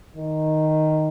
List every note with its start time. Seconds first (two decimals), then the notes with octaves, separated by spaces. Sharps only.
0.16 D#3